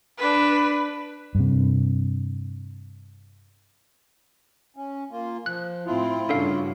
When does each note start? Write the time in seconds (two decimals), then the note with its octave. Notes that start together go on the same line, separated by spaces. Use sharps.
0.18 D4 B4
1.35 G2 C3
4.77 C#4
5.11 A#3 F4
5.46 F3 F#6
5.86 A2 C4 E4 F4
6.29 G2 C#3 D4 F#4 A4 F5